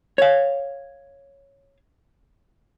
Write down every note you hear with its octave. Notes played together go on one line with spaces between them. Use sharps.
C#5 F5